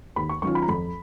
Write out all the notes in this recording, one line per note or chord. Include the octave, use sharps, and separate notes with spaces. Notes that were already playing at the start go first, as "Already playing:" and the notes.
D#2 B5
C#6
D#3 F#3 C#4 F4 C#6
B5
A#5
F2 B5